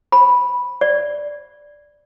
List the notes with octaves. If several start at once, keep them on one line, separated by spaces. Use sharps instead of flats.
B5
D5